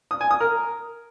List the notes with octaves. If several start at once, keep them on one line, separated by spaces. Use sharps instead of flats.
D#6
G#5
D#6
A#4